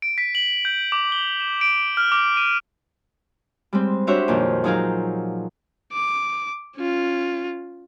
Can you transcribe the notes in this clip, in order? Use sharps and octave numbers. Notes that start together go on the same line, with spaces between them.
D7
B6
F#7
G6
D6
G7
E7
D7
F6
D6
D#7
G3 G#3 C4
D4 F#4 G4 C5 C#5 E5
F2 A#2 D#3
F3 F#3 D#4 G#4 A#4 F5
D6
C#4 F4